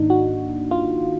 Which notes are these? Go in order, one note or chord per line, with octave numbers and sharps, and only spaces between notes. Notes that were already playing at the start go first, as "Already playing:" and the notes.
Already playing: G#2 D#3 A#3 D4 D#4
F#4
F4